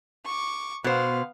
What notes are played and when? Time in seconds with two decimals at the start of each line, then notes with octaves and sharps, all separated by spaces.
0.25 C#6 D6
0.84 B2 B3 C5 F5